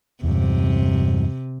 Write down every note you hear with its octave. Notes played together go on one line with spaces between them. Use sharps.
E2 G2 C3